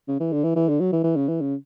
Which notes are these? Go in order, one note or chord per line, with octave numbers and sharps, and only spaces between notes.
C#3
E3
D3
E3
E3
D3
F#3
E3
E3
C#3
E3
C#3